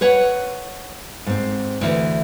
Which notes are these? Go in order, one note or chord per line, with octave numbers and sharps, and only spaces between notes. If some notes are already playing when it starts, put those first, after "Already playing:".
B4 C#5 F#5
G#2 C4
D2 E3